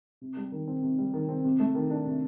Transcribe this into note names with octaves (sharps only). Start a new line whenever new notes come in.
C3
G3
D#3
C4
C3
G3
D#3
C4
C3
A3
D#3
D4
C3